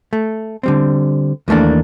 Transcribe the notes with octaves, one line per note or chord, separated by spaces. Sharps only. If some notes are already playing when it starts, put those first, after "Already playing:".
A3
D3 G3 C4
D#2 E3 A3 A#3 D4